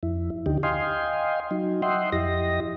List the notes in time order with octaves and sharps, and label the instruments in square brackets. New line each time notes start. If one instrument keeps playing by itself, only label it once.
[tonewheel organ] F2 E4
D2 D3 D#4 G4
D#5 F5 G5 G#5 C6
F#3 D#4
D#5 E5 F#5 G5 C6
F2 E4 G4 D#5 A#6